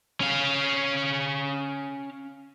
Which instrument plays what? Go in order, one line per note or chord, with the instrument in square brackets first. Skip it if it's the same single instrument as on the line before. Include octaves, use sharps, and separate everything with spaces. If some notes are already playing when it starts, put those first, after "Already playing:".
[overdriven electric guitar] C#4 F5